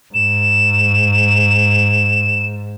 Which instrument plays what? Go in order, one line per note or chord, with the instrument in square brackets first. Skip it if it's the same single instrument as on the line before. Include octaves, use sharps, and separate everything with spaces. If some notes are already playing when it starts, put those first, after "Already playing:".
[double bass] G#2 [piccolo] E7